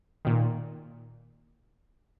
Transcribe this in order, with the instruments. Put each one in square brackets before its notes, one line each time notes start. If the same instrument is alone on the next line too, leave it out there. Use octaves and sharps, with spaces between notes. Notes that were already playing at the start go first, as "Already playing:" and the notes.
[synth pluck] A#2 D#3